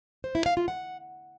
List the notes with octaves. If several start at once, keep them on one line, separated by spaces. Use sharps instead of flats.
C5
E4
F5
F4
F#5